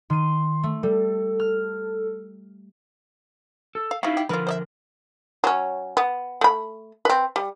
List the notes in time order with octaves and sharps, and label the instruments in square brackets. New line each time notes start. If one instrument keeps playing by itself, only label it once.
[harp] D#3 D#7 [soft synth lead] C6
[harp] A3
[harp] G3 [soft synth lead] A4
[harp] F6
[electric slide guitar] A4
[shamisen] F5
[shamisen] C#3 F#4 [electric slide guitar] D#4 E4 F5
[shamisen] G4
[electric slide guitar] D3 F3 A#4 [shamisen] F4 B4
[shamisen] C5 D5 E5
F#3 C#4
B3
A3 B5
C4 B4
G3